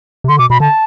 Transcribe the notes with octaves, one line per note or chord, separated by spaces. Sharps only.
C3
D3 C6
B2 D6
B2 B5
D3 A5